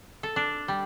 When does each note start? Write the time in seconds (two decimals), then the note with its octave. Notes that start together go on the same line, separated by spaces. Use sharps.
0.23 A4
0.36 D4
0.68 G3